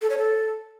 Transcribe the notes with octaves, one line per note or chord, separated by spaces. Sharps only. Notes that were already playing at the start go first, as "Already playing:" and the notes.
A4
C#5
A4